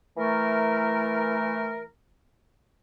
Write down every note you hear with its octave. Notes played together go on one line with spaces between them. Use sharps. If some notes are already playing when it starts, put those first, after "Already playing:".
E3 A3 A#4